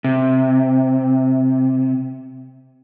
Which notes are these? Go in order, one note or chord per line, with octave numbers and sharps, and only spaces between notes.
C3